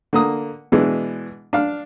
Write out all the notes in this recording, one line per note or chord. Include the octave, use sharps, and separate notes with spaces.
D3 A#3 D#6
B2 E3 G#3 D4
D4 F5